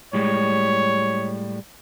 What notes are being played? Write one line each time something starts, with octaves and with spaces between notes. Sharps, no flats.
A2 G3 G#3 C#5